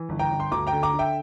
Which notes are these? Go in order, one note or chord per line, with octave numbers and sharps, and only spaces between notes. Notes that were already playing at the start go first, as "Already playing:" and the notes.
Already playing: E3
G1
G5 A#5
G1
C6
D2 A#5 D6
G5 A#5
D3
A#5 D6
D3
E5 G5